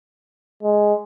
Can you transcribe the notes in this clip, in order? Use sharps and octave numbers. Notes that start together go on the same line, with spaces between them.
G#3